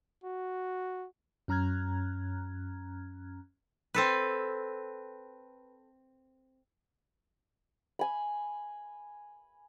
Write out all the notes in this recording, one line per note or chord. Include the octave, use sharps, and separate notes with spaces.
F#4
F#2 C#4 A#5 F6 F#6 G#6
C4 A4 B4
G#5 B5